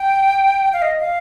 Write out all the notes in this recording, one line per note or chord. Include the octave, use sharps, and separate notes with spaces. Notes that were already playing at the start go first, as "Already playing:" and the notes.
Already playing: G5
F5
D#5
F5